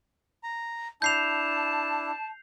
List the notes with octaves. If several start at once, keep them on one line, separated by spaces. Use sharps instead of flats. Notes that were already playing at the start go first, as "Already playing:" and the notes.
A#5
D4 E4 A5 G6 C7 F7